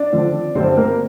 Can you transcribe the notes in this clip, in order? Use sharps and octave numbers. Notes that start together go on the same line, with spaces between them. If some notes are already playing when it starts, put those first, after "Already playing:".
Already playing: D4 D5
D3 F3 C4
G2 D3 G3 C4 C5
A#3 A#4